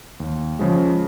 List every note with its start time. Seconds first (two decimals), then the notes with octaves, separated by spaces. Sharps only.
0.20 D#2
0.59 C#3 F3 G#3